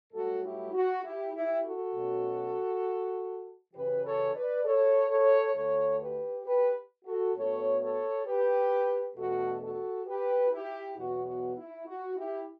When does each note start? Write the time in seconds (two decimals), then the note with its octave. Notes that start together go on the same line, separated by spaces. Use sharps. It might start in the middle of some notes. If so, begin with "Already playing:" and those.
0.13 G2 F#3 A3 F#4 A4
0.43 E4 G4
0.74 F#4
1.04 E4 G4
1.33 E4 G4
1.64 F#4 A4
1.94 B2 F#3 A3 C#4
3.74 F#2 C#3 E3 G4 B4
4.04 A4 C#5
4.34 B4 D5
4.65 A4 C#5
5.10 A4 C#5
5.54 D2 D3 A3 A4 C#5
6.00 G4 B4
6.45 G4 B4
7.05 F#4 A4
7.35 A2 F#3 B3 D4 A4 C#5
7.81 A4 C#5
8.26 G4 B4
9.16 E2 B2 A3 D4 F#4 A4
9.62 F#4 A4
10.07 G4 B4
10.51 E4 G4
10.96 E2 B2 F#3 B3 F#4
11.26 F#4
11.57 E4
11.87 F#4
12.16 E4 G4